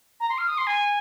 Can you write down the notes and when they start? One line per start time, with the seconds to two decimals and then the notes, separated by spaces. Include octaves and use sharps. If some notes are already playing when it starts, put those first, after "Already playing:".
0.20 A#5
0.29 C6
0.38 F6
0.48 D#6
0.58 C6
0.67 G#5